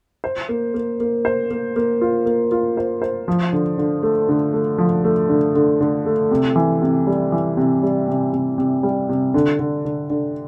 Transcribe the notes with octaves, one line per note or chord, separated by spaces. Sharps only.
C5
A#3
A#3
A#3
C5
A#3
A#3
F4
A#3
F4
C5
C5
F3
D3
D3
A3
D3
A3
F3
A3
D3
D3
D3
A3
C3
E3
C3
G3
E3
C3
G3
C3
C3
C3
G3
C3
D3
D3
D3
D3